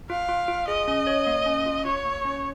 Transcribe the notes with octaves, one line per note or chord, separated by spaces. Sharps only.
F4 F5
F4
F4
G#4 D#5
C#4
C#5
A#3
C#4
F4
F4 C#5
A#3
C#4